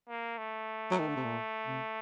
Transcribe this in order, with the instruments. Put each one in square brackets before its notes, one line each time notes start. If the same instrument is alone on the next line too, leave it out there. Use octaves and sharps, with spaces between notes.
[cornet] A#3
A3
[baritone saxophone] F#3
D#3
D3
C3
A#2
C3